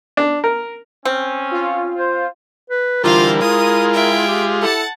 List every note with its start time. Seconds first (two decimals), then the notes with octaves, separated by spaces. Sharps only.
0.17 D4
0.44 A#4
1.05 C4 C#4
1.51 F4
1.98 C5
2.70 B4
3.04 D3 E3 G3 F4 A#4 C5 F5
3.41 G#3 E4 F4 D#6
3.94 E5 G5
4.28 G4
4.62 E4 A4 F#5 A5